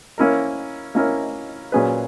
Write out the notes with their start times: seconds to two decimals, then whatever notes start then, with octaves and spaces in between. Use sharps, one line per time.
0.18 A#3 C#4 E4 A#4
0.95 A#3 C#4 E4 A#4
1.72 A#2 F#3 C#4 G#4 B4